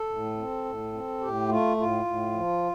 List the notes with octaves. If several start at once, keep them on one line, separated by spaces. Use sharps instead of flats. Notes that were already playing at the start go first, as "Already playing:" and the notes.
Already playing: A4
A2
C4
A2
C4
A2 G4
A3 F4
A2 F4
A2
F3